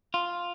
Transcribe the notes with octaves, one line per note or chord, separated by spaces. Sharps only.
F4